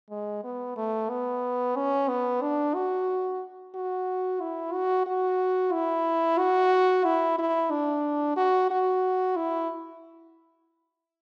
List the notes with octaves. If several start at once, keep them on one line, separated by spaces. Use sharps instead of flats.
G#3
B3
A3
B3
C#4
B3
D4
F#4
F#4
E4
F#4
F#4
E4
F#4
E4
E4
D4
F#4
F#4
E4